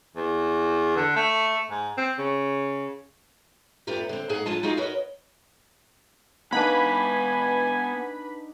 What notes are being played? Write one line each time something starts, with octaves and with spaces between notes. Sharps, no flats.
E2
D3
A3
G#2
C4
C#3
F#2 A3 B3 F4 G4 A#4
D3 C4
G#2 A#3 G#4 F#5
D3 F3 F4 G#5 A5
D#4 F4 F#4 G#4 F5
F#4 A#4 B4 C#5 D#5
B3 D4 D#4 B4 F5 F#5 G#5 B5